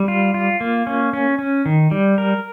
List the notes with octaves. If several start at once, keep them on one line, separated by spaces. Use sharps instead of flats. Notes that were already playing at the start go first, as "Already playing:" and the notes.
Already playing: G3
F4
F4
A#3
C#4
C#4
C#4
D#3
G3
A#4